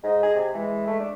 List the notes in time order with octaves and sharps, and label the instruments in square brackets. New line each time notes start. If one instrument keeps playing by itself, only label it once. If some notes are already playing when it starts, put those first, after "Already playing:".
[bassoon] G#2 [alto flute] D#5
[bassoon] G#4
C3
[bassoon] E3 [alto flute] G#3
[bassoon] A3
D4